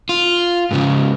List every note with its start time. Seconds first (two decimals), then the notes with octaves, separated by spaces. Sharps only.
0.09 F4
0.71 G#2 C#3